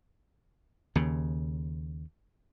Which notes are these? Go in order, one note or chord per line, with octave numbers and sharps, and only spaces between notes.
D#2 C#3